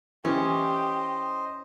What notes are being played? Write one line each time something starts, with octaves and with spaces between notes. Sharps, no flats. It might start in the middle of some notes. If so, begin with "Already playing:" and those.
E3 C#4 G4 C5 D#5